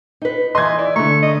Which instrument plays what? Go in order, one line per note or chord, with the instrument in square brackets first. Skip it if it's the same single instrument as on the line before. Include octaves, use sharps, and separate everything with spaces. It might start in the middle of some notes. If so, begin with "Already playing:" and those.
[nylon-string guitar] D#4 B4
[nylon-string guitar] E3 D#4 [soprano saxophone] D#5 [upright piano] C6 G#6
[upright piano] E4 [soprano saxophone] D5
[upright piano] D3 A#5 [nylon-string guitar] A3 [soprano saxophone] C#6
[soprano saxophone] D#5